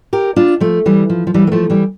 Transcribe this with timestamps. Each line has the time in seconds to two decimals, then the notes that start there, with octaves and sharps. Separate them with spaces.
0.13 G4 A#4
0.36 D4 F4
0.60 F3 A3
0.86 E3 G3
1.10 F3
1.27 F3
1.34 E3 G3
1.47 A#3
1.52 F3 A3
1.70 E3 G3